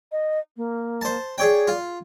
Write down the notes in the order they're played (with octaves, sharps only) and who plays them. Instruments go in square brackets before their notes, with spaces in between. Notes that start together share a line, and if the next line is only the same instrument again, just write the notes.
[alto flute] D#5
A#3
[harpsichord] C5 A5
[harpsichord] G#4 C#5 G5 [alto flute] D5
[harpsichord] F4